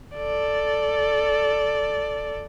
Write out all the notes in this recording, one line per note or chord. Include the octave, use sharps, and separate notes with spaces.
A4 D5